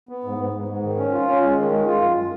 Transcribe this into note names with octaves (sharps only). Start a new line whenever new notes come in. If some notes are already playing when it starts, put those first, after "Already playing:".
B3
G#2
G#2
G#2
G#2
D#3
C#4
F4
C#4
G#3
D#3
G#3
F4
F#2